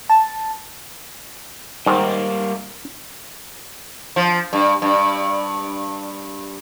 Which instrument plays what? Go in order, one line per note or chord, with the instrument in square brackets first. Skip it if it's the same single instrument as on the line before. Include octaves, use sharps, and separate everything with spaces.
[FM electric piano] A5
[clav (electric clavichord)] G#2 D#3 [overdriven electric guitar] G3 A#3
[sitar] F3
G2
G2